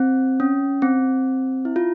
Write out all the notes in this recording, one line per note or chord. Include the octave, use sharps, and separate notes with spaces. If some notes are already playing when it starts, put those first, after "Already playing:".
Already playing: C4
C#4
C4
E4
F4